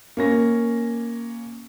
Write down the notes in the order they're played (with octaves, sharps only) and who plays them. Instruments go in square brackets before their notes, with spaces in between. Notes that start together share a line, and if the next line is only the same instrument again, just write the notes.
[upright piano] A#3 C#4 A#6